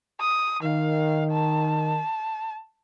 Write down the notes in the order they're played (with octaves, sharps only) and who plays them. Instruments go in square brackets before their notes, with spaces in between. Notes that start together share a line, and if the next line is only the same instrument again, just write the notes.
[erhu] D#6
[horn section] D#3 [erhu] F5
[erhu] A5